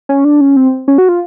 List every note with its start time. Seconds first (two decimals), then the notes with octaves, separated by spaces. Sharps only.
0.09 C#4
0.24 D4
0.41 C#4
0.56 C4
0.88 C#4
0.98 F#4
1.09 F4